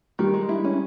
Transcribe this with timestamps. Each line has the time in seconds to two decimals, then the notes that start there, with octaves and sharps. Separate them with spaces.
0.19 D#3 G3
0.34 G#3
0.49 E4
0.64 C#4